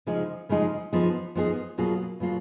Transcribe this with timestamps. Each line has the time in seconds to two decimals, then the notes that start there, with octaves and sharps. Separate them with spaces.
0.07 C#3 F3 G#3 D#4 G#4
0.49 C#3 F3 G#3 D#4 G#4
0.93 F3 B3 D#4 G#4
1.35 F3 B3 D#4 G#4
1.78 B2 F#3 A#3 F4 G#4
2.20 B2 F#3 A#3 F4 G#4